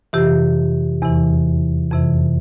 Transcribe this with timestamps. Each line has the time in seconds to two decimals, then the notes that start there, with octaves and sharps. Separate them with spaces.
0.13 F2 C3 E3 G4
1.02 E2 C3 E3
1.91 F2 C3 E3